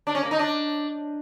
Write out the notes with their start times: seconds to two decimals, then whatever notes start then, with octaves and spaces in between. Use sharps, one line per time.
0.07 D4
0.15 C#4
0.23 A#3
0.31 D#4
0.39 D4